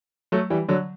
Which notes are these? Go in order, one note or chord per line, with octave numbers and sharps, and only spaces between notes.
F#3 A3
E3 G3
D3 F#3